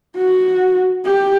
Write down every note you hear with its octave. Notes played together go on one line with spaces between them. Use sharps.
F#4
G4